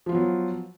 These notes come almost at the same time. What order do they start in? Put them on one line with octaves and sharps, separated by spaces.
F3 F4 B3 F#3